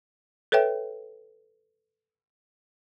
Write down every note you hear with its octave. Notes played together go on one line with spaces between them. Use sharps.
A4 B4 C#5 E5 G5